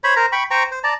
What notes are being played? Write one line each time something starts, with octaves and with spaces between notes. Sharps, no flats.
C5 C#5 B5
A#4 C5 A#5
G5 B5 C#6
C5 G5 A#5 C#6
C5
D5 A5 A#5